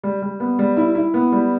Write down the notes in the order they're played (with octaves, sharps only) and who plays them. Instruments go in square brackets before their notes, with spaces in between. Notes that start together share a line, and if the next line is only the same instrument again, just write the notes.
[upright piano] G3
G3
B3
G3
E4
E4
B3
G3